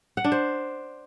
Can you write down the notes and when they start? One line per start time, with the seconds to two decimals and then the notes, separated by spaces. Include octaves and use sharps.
0.17 F#5
0.24 D4
0.32 C5